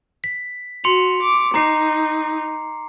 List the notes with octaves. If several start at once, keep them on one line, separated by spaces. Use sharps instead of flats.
B6
F#4 C6 C#7 F7
D6
D#4 A#5 D6 C7